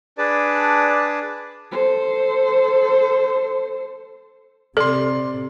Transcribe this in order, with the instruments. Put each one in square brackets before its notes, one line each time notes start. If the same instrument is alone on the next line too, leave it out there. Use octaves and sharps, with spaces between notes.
[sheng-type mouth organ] D4 G#4 B4 D5 A5
[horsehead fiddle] A4 C5
[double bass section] C3 [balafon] A4 [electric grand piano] D5 C6